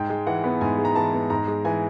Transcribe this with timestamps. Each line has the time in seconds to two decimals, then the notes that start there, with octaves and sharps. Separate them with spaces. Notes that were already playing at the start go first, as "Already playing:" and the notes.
Already playing: G#2 G5
0.10 G#3
0.27 E3 F#5
0.44 B3
0.61 G#2 G#5
0.78 G#3
0.85 A#5
0.96 E3 A5
1.13 B3
1.30 G#2 A#5
1.48 G#3
1.65 E3 G#5